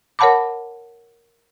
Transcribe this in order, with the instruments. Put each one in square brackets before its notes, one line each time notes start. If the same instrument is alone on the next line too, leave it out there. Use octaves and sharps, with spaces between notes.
[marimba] A#4 C#5 F#5 A5 B5 D6